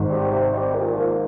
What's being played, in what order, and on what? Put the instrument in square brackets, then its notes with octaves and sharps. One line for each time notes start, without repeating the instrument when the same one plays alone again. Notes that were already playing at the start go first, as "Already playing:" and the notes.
Already playing: [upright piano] G#1 G#2
[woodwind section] G3 C4 G4
C3
G3 C4 G4
A#2
F3 A#3